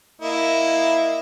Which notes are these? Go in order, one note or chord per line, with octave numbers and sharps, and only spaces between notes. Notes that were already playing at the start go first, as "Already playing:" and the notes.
A#3 E4 D#5